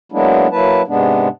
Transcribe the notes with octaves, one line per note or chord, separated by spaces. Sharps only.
F#3 G#3 A#3 B3 D4 E4
F#3 A#3 E4 B4 A5
G#2 C3 G#3 B3 D4